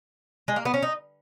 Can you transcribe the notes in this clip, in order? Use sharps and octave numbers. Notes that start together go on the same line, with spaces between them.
G#3
A#3
B3
C#4
D#4